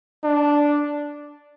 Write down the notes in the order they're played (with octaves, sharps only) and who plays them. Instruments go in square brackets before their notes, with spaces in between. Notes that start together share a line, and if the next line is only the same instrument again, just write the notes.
[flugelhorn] D4